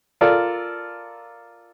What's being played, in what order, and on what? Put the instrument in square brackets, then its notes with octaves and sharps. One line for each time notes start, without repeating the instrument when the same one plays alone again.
[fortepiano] F4 A4 A#4 D5